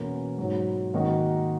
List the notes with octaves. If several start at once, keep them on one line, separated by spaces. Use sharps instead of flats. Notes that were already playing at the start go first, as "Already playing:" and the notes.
Already playing: E2 B2 A#3 C#4
G#2 F#3 A#3
G#2 D#3 A#3 D#4 F#4